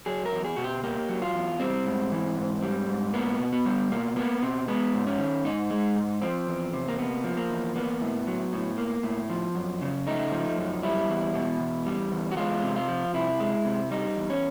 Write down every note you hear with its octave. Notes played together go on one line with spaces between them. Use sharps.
F#3 G#4
A#4
E2
G#4
B2 F#4
G4
A#3 G4
F#3
F4
E2
G3 C4
G#2
E3
G#2
G3
G#2
A#3 B3
B2
B3
G3
B2 A#3
A#3 B3
B2 C4
G#3 B3
G#2
C#4
D#3
G#2 D#4
G#3
G#2
F3 C4
E2
C3
A#3
A#3 B3
F3
A#3
E2
A#3 B3
A2
F#3
A2
A#3
A2
F3
F#2
C#3
A3 D#4
F3
F#2
G3 E4
E2
B2
E2
G3
E2
F#4
G#3 F4
C3
F4
F3
C3 E4
G#3
C3
G3 D#4
E2
C#4